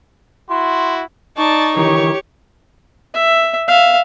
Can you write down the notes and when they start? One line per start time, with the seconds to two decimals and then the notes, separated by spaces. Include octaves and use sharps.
0.49 E4 F#4 C6
1.37 D#4 D5 A5 C#6
1.77 D#3 E3 G4 A#4 C#5
3.14 E5
3.68 E5 F5